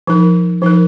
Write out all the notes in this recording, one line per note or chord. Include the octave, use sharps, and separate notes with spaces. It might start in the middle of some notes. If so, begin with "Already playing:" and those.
F3 D#4 A#4
F3 D#4 A#4